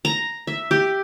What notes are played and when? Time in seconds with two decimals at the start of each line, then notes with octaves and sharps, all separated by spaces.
0.05 A#5
0.47 E5
0.71 G4